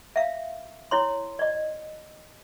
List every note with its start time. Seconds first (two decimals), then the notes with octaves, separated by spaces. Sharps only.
0.16 E5 F5
0.91 E4 C#5 C6
1.39 D5 D#5